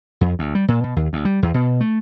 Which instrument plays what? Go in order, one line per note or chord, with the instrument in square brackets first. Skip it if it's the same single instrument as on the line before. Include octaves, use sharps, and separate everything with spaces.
[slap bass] F2
D2
G3
A#2
B2
D#2
D2
G3
E2
B2
A3